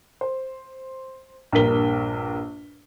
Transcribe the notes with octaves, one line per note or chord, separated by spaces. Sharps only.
C5
A#1 G2 A#3 A#4 B6 G7